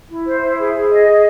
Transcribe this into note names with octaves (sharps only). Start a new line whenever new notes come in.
E4
C5
E4
G#4
G#4
D#5
G#4